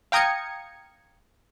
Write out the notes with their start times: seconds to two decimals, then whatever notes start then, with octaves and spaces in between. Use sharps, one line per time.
0.12 F5 G5 A#5 D#6 G#6 C#7